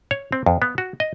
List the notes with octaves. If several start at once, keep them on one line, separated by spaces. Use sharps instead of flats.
C#5
C4
F2
B3
F#4
D#5